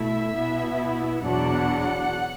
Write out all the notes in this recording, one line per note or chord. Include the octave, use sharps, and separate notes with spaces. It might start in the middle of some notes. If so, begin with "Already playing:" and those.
Already playing: B2 A3 E4 E5
B2 B3 E4
E2 B2 F#3 D4 F#5